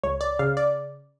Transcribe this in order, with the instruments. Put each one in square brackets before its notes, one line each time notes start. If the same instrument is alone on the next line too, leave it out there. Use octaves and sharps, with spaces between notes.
[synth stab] C#2 C#5
D5
C#3 F5
D5